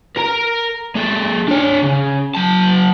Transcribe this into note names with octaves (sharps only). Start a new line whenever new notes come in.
A#4 A#5
G#3 A4
D4 C#5
C#3
F#3 A5